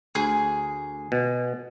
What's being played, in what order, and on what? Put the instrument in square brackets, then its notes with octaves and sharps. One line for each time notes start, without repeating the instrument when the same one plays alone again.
[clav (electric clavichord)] D2 [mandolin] G#4
[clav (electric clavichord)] B2